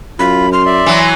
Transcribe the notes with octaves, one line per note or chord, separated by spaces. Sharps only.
F#2 F4 B5
C6 F6
D5 E5
E3 F#3